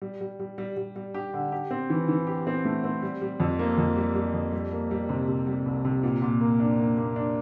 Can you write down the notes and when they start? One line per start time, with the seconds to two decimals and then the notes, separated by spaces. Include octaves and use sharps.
0.02 G3
0.21 G3
0.40 G3
0.58 G3
0.77 G3
0.96 G3
1.14 G4
1.33 D3
1.52 G4
1.71 C4
1.90 E3
2.08 E3
2.27 G4
2.47 C4
2.65 A3
2.84 C4
3.02 G3
3.22 G3
3.40 F2
3.59 A#3
3.78 F2
3.96 G3
4.15 G3
4.34 F2
4.53 G3
4.72 A#3
4.91 G3
5.09 C3
5.28 C3
5.47 G3
5.66 C2
5.85 C3
6.03 A#2
6.22 A#2
6.41 A#3
6.60 D4
6.79 A#3
6.98 A#3
7.16 D4